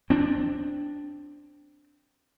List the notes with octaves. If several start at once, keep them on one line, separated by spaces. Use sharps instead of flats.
C4 D4